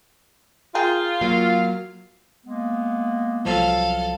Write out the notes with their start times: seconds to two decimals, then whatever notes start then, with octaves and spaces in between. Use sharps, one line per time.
0.75 F4 G#4 A#4 G5
1.21 F#3 A#3 F5
2.45 G#3 A#3 B3
3.45 C2 F3 F#3 A4 F5